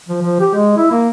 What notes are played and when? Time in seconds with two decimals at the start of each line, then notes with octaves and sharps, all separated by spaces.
0.09 F3
0.22 F3
0.40 G4
0.55 G#3
0.78 E4
0.91 A#3